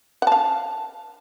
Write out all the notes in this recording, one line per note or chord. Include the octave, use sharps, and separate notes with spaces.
F5 F#5 A5